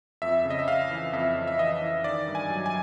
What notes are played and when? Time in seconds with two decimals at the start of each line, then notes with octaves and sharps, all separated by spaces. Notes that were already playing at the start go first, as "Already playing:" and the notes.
0.22 F2 E5
0.45 C#3
0.50 D#5
0.59 E5
0.68 C#3 F5
0.90 E3
1.13 F2 E5
1.36 F2
1.47 E5
1.59 E3 D#5
1.82 E3
2.04 D#3 D5
2.27 G2
2.35 G#5
2.50 F#3
2.66 G#5